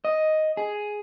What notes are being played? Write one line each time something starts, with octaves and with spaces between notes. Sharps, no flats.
D#5
G#4